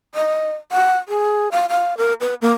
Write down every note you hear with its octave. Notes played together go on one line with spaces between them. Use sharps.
D#5
F#5
G#4
F5
F5
A#4
B4
A#3